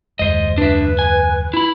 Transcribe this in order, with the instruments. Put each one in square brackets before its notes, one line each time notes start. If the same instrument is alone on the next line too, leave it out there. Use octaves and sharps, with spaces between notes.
[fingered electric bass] F#1 D#2 G#3 [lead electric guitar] C5 D#5
[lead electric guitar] D4 E5 [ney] B4
[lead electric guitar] G#5
E4 B5